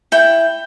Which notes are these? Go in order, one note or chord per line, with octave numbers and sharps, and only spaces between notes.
E4 G5